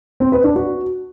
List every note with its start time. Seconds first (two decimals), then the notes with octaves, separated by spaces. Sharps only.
0.20 C4
0.32 B4
0.44 D4
0.56 F#4